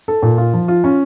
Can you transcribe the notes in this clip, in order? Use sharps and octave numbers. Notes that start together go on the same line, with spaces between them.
A4
A#2
F4
F3
F4
C#4